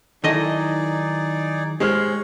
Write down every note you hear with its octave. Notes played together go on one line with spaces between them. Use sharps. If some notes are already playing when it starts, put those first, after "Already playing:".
D#3 F#3 A3 D#4 E4 G#4 D5 D#5
G#2 G#3 G4 C5 C#5 F6